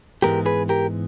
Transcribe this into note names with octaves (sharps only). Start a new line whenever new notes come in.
G#2 E3 G#3 B3 G4 A#4
G#4 B4
G4 A#4